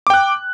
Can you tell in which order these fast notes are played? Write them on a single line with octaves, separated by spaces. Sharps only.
D6 G5 F#6